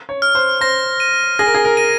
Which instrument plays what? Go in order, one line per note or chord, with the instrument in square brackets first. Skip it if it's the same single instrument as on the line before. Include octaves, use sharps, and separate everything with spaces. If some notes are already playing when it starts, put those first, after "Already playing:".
[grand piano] C#5
[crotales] F6
[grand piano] C5
[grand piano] C5 [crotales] A#6
[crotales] D#7
[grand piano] G#4 [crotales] A#6
[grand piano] A#4
G#4
A#4
[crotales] D#7